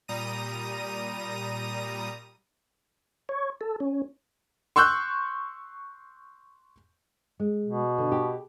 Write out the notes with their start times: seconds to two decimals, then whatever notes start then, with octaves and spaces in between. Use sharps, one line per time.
0.08 A#2 G3 A#5 D#6 A#6 D#7
3.29 C#5
3.61 A4
3.80 C#4
4.76 C6 C#6 E6 F#6 G6
7.40 G#3
7.66 B2
7.98 D3
8.12 G4